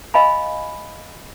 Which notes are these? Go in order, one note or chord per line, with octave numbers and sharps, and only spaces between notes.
D#5 F5 G#5 B5